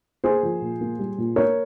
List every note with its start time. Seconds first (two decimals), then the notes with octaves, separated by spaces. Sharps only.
0.24 A#3 G#4 C5
0.43 F3
0.61 A#2
0.81 A#3
0.99 G3
1.18 A#2
1.36 A#3 A#4 C#5